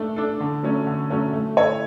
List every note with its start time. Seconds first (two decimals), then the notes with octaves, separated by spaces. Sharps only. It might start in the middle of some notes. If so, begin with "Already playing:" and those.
Already playing: A3 D4 A4
0.16 D4 A4
0.40 D3
0.63 F#3 A3 C#4
0.87 D3
1.10 F#3 A3 C#4
1.33 A3
1.57 E4 A4 C#5